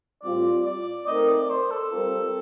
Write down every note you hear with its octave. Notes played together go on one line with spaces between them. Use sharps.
A2 G3 C4 F4 D5
D5
A3 C4 D#4 A#4 D#5
D5
C5
A4
G3 C4 F4 A#4